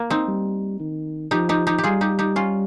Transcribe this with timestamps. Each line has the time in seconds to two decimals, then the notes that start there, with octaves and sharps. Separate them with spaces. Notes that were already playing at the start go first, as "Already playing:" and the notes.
Already playing: A#3
0.10 C4 D#4
0.28 G3
0.80 D#3
1.31 F3 D#4 G4
1.49 D#4 G4
1.67 D#4 G4
1.78 G4
1.84 G3 F4 G#4
2.01 D#4 G4
2.19 D#4 G4
2.36 C#4 F4